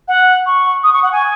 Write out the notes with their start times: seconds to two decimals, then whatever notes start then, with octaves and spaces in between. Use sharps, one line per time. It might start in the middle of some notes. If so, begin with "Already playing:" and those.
0.08 F#5
0.46 C#6
0.84 D#6
0.93 C#6
1.03 F#5
1.12 G#5